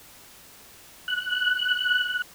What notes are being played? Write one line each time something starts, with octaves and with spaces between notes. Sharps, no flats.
F#6